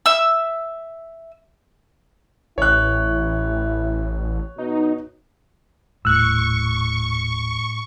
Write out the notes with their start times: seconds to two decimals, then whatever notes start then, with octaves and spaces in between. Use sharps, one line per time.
0.06 E5 E6
2.58 A1 E4 C#5 F#6
4.58 B2 D#4
6.05 D#1 A2 C#6 E6 F#6